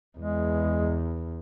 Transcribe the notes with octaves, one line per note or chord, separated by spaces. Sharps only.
E2 G#3